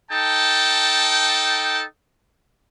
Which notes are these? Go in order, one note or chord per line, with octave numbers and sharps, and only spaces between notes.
D#4 A4 G5 A5